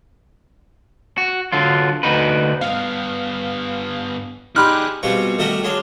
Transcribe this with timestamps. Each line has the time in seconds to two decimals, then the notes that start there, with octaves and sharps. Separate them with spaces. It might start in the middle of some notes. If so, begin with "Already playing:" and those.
1.18 F#4
1.52 D3 F#3 F4
2.03 D2 D#4 F#4 B4
2.61 G2 B3 F5
4.56 D#4 G4 G#4 D5 B5 C6 F6 F#6
5.03 B2 G3 G#3 C4 F4 C#6
5.38 D#3 G3 A3 F#4 A#4 D#5
5.63 F#3 G#3 D4 F5 C6